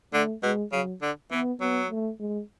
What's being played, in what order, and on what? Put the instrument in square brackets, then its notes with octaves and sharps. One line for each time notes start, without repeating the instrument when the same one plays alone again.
[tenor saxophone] D3 [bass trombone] A3
[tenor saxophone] B2 [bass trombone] G#3
[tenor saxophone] C#3 [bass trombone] F#3
[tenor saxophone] D3
[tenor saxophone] E3 [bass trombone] B3
[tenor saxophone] F#3 [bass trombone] B3
[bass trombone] A3
G#3